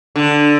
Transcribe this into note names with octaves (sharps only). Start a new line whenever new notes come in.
D3